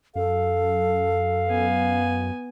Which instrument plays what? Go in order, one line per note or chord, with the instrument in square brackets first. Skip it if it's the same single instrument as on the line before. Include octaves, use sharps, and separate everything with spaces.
[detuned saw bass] F#2 [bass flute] A4 [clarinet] F5
[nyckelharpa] B3 G#5